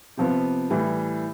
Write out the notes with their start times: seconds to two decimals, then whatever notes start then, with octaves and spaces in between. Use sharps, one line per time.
0.17 C3 F3 B3
0.70 A2 E3 G3